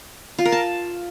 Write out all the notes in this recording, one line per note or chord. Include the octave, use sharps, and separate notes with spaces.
F4
A#4
A5